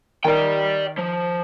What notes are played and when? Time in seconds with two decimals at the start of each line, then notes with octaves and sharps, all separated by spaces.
0.25 D#3 D5 G5
0.99 F3